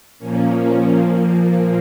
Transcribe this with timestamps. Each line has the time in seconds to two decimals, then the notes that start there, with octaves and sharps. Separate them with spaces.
0.18 A#2 F3 A#3 C#4
0.94 A#2 F3 A#3